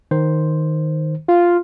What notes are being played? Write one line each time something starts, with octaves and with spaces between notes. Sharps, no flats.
D#3 C5
F4